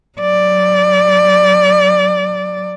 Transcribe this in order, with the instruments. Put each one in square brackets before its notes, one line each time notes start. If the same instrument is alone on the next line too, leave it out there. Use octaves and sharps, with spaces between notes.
[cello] F#3 D5